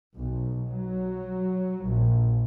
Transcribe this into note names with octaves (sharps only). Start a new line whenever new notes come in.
B1
F#3
A#1